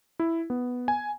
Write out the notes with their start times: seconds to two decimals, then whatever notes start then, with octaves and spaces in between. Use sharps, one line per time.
0.20 E4
0.50 B3
0.88 G#5